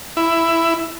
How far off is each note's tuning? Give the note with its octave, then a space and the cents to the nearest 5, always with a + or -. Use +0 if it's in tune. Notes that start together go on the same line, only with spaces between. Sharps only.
E4 +10